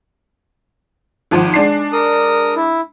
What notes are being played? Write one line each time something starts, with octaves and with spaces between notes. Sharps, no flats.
G#1 F3 F#5
G#3 D4 C7
A#4 D#6
E4